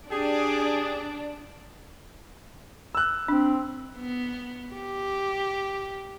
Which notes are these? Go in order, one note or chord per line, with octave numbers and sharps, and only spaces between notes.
D4 G4 G#4
E6 F#6
C4 D4
B3
G4